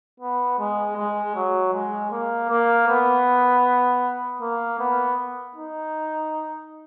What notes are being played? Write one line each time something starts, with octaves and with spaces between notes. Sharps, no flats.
B3
G#3
G#3
F#3
G#3
A#3
A#3
B3
A#3
B3
D#4